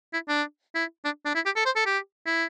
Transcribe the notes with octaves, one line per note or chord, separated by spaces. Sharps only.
E4
D4
E4
D4
D4
E4
G4
A4
C5
A4
G4
E4